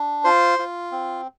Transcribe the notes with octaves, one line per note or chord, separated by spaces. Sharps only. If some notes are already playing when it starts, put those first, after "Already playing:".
Already playing: D4
F4 C5
F4
C4